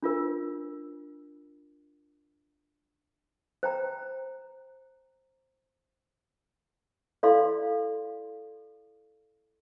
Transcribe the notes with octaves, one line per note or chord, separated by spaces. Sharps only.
D4 F4 A#4
C5 G5 A#5
E4 A4 D5 F5 C6